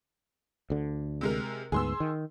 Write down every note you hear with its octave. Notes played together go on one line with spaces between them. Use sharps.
D2 D3
C3 G#3 A#4
D2 G#2 B3 G#4 C6 E6
D#3